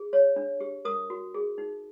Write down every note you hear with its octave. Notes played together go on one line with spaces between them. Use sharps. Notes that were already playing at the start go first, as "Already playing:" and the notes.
Already playing: G#4
C#5
D4
G4
A#4 D#6
F#4
G#4
D#4